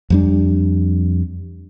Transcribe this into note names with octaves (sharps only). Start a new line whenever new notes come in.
F2 G3 D4